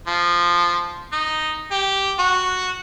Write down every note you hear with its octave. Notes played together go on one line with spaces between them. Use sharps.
F3
D#4
G4
F#4